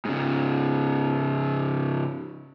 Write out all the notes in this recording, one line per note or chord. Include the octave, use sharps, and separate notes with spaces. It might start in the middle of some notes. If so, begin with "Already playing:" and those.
G#2 C#3